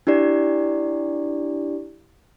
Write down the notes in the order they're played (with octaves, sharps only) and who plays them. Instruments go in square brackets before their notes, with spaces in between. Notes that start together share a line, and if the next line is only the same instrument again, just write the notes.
[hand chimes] D4 E4 G4 D5